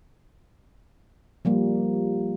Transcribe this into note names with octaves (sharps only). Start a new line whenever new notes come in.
F3 G3 A#3